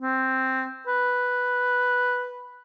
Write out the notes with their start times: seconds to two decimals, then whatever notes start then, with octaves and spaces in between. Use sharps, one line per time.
0.01 C4
0.87 B4